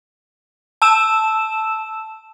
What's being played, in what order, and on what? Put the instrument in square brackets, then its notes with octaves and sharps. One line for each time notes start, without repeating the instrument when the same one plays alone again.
[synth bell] A5 E6 E7